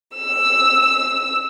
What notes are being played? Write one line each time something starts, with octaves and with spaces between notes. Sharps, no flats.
E6